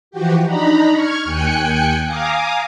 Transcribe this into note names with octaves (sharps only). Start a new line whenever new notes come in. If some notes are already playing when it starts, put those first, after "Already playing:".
E3 F3 F#4 G4
D4 D#4 A#5 B5
C#6 F6 G#6
D#2 G5 G#5 F#6 C#7
F5 G#5 A#5 D6 D#6